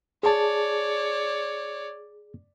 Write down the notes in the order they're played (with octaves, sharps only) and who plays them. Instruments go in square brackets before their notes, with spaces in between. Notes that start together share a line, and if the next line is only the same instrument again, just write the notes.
[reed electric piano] G#4 A5 [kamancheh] C#5 D5